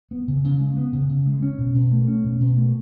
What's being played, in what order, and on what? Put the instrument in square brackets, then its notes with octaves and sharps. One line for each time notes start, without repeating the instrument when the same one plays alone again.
[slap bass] B3
C#3
C#3
G#3
B3
C#3
C#3
G#3
C#4
B2
B2
A3
C#4
B2
B2
A3